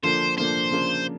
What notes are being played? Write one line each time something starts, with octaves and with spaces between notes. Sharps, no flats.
D3 F3 A#3 D4 C5
D3 F3 A#3 D4 C5
C#3 F3 A#3 D4